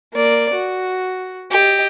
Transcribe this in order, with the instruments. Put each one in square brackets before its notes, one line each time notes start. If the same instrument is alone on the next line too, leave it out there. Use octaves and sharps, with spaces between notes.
[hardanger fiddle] A#3 D5
F#4
G4 D#5